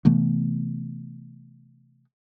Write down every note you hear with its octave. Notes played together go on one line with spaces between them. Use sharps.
C3 E3 A3 B3